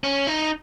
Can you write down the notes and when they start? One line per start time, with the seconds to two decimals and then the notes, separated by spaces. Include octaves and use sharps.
0.04 C#4
0.27 D#4